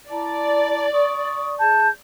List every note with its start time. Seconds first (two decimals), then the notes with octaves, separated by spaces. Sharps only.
0.10 E4 D5 A5 A#5
0.91 C#6 D#6
1.59 G#4 A5 G6